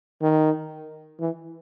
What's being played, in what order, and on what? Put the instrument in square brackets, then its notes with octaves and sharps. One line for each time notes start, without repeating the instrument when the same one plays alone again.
[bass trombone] D#3
E3